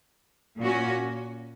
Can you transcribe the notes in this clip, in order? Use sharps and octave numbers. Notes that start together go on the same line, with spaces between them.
A#2 A#3 C#4 F#4